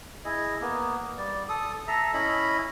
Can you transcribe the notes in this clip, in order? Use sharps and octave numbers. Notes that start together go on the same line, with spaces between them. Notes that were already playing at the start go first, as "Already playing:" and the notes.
E4 G#4 D#5
A#3 B3
G3 D5
A4 D#6
A4 E5 A#5
C#4 E4 D#5 B5